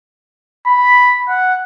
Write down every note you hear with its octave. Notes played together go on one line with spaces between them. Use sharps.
B5
F#5